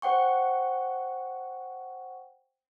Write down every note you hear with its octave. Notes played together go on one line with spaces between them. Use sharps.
C5 F#5 G5 C#6